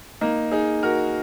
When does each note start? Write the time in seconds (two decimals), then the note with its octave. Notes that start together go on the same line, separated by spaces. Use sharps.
0.21 A#3 D#4
0.52 D#4 G#4
0.83 F#4 A#4